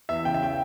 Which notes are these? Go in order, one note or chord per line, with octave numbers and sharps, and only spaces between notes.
E2 E5
C#3 G5
E5
G5